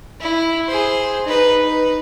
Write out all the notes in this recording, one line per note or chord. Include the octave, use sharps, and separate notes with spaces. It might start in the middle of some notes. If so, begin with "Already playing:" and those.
E4
G#4 C5
D#4 B4
D#4 B4